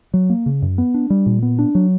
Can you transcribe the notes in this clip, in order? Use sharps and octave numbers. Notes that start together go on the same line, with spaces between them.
F#3
A#3
C#3
F#2
B3
D4
G3
A#2
B3
D4
F#3